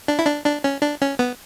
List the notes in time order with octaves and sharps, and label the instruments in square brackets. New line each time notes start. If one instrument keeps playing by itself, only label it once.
[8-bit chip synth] D4
E4
D4
D4
C#4
D4
C#4
B3